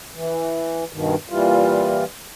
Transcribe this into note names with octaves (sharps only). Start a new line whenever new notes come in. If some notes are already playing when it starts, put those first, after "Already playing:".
E3
G2 B2 D#3
A#2 E3 G3 F4